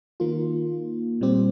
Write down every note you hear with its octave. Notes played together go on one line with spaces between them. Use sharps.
D#3 A#3 F4
A#2 G3 C4 G4